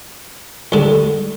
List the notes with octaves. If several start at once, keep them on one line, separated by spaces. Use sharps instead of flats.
D#2 D3 G3